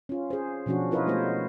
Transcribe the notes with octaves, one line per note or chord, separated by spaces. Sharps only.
C#4 F4
G#4 C5
B2 F3 C#4 D4 F#4
E4 F4 A#4 B4 C#5 D#5
G#3 A3 B3 F4 C5 C#5